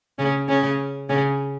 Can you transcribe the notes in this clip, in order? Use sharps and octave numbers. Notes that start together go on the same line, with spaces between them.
C#3 C#4
C#3 C#4
C#3 C#4